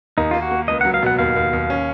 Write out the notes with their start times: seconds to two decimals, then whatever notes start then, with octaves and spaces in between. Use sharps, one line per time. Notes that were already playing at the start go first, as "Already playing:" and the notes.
0.17 D#2 D#4
0.31 A#3 F4
0.42 F#4
0.51 A#3
0.68 C#2 D#5
0.81 F#3 F#5
0.94 F5
1.03 B2 F#5
1.19 D#2 F5
1.36 D#2
1.53 D#2
1.70 C#4